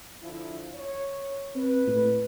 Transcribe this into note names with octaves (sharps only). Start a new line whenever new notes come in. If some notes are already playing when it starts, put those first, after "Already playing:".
D3 F3 E4
C#5
C4 B4
A2